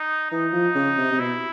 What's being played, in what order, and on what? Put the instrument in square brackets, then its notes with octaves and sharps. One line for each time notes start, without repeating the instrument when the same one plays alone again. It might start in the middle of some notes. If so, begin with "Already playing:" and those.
Already playing: [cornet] D#4
[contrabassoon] E3 [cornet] D#4
[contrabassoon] F3
C#3
C3
C3
[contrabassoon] B2 [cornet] E4